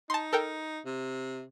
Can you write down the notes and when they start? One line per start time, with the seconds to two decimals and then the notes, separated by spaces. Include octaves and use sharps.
0.10 D#4 A5 C6
0.33 A4 A#4 G5
0.85 C3